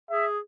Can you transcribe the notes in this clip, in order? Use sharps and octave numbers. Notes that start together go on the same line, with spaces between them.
G#4 E5